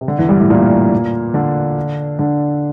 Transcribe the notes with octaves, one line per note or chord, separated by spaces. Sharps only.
C3
D3
E2 E3
G2 G3
A2 A3
A#2 A#3
D3 D4
D3 D4